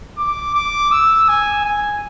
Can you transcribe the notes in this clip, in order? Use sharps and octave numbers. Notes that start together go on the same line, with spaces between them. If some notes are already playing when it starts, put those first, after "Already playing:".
D6
D6
E6
G#5
G#5